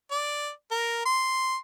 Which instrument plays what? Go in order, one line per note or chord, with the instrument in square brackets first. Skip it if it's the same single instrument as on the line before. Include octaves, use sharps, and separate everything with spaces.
[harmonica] D5
A#4
C6